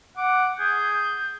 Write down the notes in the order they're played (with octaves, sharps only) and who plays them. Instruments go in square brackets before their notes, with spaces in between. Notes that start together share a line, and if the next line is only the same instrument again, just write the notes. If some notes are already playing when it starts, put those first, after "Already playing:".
[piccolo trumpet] F#5 [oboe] D6
[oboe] G#4 [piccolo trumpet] G6